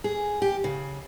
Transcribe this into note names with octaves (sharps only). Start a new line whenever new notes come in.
G#4
G4
C#3